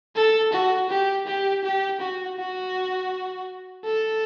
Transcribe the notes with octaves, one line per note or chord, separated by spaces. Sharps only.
A4
F#4
G4
G4
G4
F#4
F#4
A4